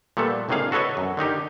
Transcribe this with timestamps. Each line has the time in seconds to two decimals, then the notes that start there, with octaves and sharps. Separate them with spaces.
0.17 A#2 G3 A3 B3 A4
0.49 G#1 A2 D3 D#3 G#4 F5
0.72 F#4 A4 B4 C#5 D#5
0.97 F#2
1.17 D3 D#3 D#4 G4